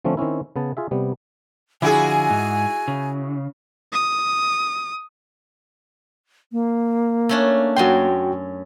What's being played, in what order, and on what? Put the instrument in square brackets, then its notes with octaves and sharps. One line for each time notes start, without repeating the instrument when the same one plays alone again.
[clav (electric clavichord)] D3 F3 A3 C4 C#4
D#3 C4 C#4 E4
C#3 B3 A5
F4 G#4 E5
C3 G3 B3
[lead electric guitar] D3 F3 [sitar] E4 F#4 G#4 [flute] G#5
[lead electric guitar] G#2 D#4
C#3
[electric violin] D#6
[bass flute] A#3
[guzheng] A3 C#4 D4
[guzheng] F#2 C#4 C6 [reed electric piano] F#4 G5